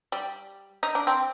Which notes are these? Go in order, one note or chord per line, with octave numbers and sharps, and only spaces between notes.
G3
D#4
D4
C4